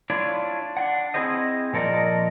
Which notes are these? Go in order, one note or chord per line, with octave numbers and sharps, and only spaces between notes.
D4 E4 F4 C#5 D5
D4 F#5
C4 C#4 E4 G#4 C5 D#5
A#2 F3 A4 A#4 D5 D#5